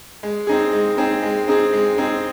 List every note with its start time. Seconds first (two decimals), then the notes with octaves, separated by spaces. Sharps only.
0.23 G#3
0.47 C4 D#4 G#4
0.73 G#3
0.98 C4 D#4 G#4
1.23 G#3
1.48 C4 D#4 G#4
1.73 G#3
1.98 C4 D#4 G#4